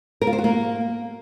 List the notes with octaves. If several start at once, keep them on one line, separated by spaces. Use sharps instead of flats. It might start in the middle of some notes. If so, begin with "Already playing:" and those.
A#4
F4
C5
F#4
A#3